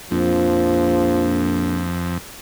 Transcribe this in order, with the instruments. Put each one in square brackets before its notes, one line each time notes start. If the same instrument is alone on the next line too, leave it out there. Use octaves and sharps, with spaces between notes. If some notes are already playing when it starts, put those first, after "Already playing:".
[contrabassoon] A#1 [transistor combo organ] F2 [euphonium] F3